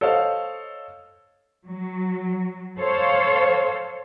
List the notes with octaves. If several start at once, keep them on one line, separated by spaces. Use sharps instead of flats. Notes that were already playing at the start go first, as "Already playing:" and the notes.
A4 C5 C#5 D#5 F5
F#3
A4 C5 C#5 F5